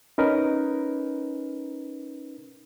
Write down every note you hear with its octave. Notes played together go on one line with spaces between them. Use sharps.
C#4 D#4 A#4 B4